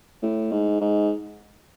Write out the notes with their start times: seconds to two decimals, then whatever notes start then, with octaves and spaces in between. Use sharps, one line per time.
0.22 A2
0.52 G#2
0.81 G#2